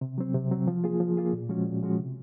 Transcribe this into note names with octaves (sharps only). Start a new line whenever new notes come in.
C3
F#3 C4
C3
F#3 C4
F3
A#3 F4 G#4
F3
A#3 F4 G#4
A#2
F3 G#3 C#4 F#4
A#2
F3 G#3 C#4 F#4
C3